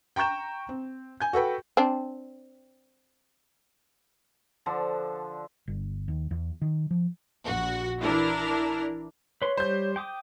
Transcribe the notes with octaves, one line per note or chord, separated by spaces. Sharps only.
G5 A#5 C#6 G6 E7
C4
G#5 G6
F#4 A4 B4 G5
C4 D4
D3 F3 D4 A4
G1
D#2
E2
D#3
F3
A#1 F#4
E3 D4 E4 A#4 F6
B4 C#5 C6
G3 C5 G6
G5 D6 D#6